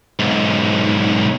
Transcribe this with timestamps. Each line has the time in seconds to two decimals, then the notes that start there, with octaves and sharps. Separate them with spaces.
0.19 B1 G#2